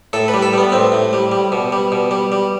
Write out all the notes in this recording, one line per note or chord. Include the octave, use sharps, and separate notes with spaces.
A2 A4
B4
G3
A4
G3 B3
A2 C4
A2
G3
G3
B2
G3
B2
G3
G3